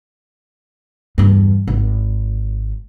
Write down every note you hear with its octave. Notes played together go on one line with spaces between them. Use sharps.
E2 G2
G#1